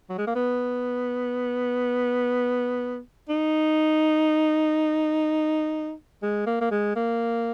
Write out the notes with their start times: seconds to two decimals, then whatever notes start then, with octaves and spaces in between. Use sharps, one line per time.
0.09 F#3
0.18 G#3
0.27 A#3
0.35 B3
3.29 D#4
6.23 G#3
6.46 A#3
6.61 A#3
6.71 G#3
6.96 A#3